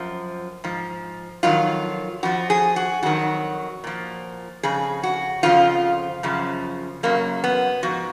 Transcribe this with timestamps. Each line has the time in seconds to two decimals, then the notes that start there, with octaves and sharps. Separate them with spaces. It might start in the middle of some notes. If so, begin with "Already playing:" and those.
Already playing: F#2 F3
0.64 G#2 F3
1.43 F2 D#3 F#3 F4
2.23 F2 F3 F#4
2.50 G#4
2.76 F#4
3.03 F2 D#3 F#3 F#4
3.84 A#2 F3
4.63 F2 C#3 G#4
5.03 F#4
5.43 F2 C#3 F3 F4
6.23 F#2 C#3 F3
7.03 F#2 C#3 F#3 A#3
7.44 B3
7.83 G#2 F3 F#4